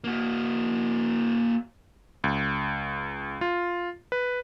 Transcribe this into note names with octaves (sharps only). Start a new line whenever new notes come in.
A#3 F#4
C#2
F4
B4